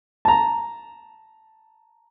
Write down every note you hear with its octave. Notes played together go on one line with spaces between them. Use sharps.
A5 A#5